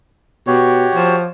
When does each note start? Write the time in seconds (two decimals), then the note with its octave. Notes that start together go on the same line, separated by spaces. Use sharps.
0.47 B2 F#4 G4 C#5
0.95 F3